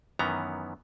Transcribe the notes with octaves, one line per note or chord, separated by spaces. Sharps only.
F#2 D#3 E3 B3 C#4 A#5